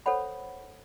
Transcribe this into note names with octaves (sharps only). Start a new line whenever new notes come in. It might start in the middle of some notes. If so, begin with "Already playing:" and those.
A4 C5 C#5 F#5 B5